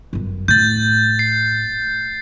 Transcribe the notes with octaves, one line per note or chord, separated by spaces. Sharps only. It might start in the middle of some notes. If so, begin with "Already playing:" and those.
G1 F#2
A2 G6 A6
C7